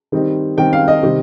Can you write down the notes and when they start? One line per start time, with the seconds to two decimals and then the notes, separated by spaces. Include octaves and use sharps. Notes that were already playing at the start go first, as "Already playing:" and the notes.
0.12 D#3 G3 C4 D#4
0.57 D#3 G3 C4 D#4 G5
0.73 F5
0.88 D#5
1.03 C3 D#3 G3 C4